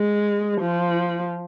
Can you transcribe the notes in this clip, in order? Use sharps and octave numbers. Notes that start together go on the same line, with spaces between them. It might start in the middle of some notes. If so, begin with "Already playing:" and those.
Already playing: G#3
F3